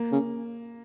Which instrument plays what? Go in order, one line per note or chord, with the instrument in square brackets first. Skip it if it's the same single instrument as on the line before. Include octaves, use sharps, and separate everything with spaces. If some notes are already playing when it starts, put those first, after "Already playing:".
Already playing: [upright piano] A#3
[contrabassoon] C#3